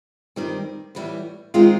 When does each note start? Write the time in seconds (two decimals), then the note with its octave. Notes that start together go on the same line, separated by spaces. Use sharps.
0.36 G2 D#3 G3 C4
0.95 A2 E3 G3 B3
1.54 D#3 G#3 C4 F4